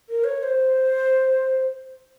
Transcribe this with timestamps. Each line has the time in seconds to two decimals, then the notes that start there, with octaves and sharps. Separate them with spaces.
0.09 A#4
0.24 C#5
0.38 C#5
0.43 C5